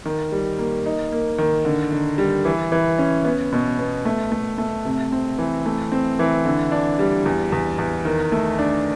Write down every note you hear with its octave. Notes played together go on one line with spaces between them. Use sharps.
D#3
G3
A#3
D#4
A#3
D#3
D3
D3
G3
E3
E3
C#4
B3
B2
B3
A3
A3
A3
C3
C4
E3
A3
C4
E3
D3
D4
G3
E2
E2
E2
D#3
A3
D4